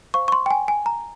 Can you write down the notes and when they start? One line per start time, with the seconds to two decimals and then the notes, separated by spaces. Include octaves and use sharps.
0.14 C5 F5 C#6
0.28 C#6
0.32 C6
0.46 G5
0.51 G#5
0.68 G#5
0.86 A#5